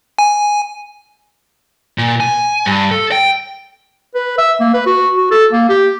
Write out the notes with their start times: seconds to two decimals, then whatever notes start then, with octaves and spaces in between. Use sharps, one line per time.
0.19 G#5
1.98 A#2
2.20 G#5
2.66 G2
2.91 A4
3.12 G5
4.15 B4
4.38 E5
4.60 A#3
4.74 B4
4.86 F#4
5.17 F#4
5.31 A4
5.53 A#3
5.69 G4